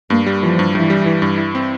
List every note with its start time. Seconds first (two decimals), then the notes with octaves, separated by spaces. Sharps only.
0.10 G2 A#3
0.26 G3
0.42 E3 F3
0.59 G2
0.75 G2 E3
0.90 G3
1.06 E3
1.22 G2
1.38 E4
1.55 C4